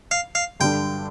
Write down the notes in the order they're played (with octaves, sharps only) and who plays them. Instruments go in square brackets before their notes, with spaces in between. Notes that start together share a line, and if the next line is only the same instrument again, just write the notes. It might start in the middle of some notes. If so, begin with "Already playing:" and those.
[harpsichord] F5
F5
[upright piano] G2 D3 G3 D4 [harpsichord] G5